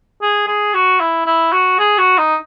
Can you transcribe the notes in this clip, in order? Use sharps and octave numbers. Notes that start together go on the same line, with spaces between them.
G#4
G#4
F#4
E4
E4
F#4
G#4
F#4
D#4